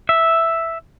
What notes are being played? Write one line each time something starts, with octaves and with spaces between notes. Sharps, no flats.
E5